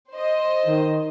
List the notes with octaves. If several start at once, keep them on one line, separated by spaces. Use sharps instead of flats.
C5 D#5
D#3